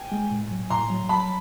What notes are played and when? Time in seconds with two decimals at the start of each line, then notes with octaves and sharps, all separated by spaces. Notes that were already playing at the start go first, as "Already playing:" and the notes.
Already playing: G5 G#5
0.12 G#3
0.31 A2
0.51 F#3
0.70 A2 A#5 C6
0.90 F#3
1.09 F#3 A5 B5